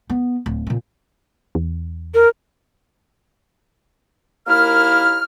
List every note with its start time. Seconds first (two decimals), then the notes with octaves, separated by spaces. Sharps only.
0.10 B3
0.46 D1
0.67 A#2 C4
1.55 E2
2.14 A#4
4.47 D#2 A#3 E4 F6